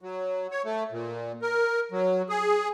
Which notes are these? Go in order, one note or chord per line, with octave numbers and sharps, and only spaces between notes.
F#3
C#5
A3
A#2
A#4
F#3
G#4